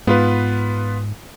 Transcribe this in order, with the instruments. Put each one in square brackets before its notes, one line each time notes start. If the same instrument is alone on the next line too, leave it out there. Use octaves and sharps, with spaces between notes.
[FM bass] G#2 [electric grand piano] B3 F4 B4